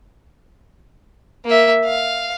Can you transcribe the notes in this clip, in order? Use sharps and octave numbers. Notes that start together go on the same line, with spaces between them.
A#3 E5
F5